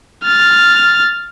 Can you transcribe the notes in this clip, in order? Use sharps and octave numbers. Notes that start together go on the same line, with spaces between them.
F6 A6